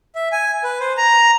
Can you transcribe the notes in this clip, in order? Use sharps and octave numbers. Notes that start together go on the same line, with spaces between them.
E5
G#5
B4
C5
A#5